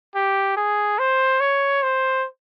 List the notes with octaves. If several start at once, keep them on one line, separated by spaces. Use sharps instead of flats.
G4
G#4
C5
C#5
C5